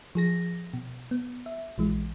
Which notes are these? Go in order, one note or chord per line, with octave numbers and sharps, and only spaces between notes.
F3 G#4 A#6
B2
B3
E5
A#1 E3 G#3